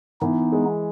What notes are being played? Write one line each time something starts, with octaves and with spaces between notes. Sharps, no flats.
E3 B3 D#4
G#3